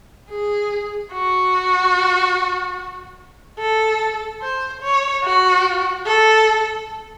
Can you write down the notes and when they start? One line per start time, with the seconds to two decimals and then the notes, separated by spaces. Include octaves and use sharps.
0.31 G#4
1.13 F#4
3.60 A4
4.42 C5
4.82 C#5
5.24 F#4
6.06 A4